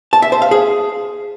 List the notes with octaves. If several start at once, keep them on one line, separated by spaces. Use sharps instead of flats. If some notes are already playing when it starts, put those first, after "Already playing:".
A5
E5
C5
F5
G#4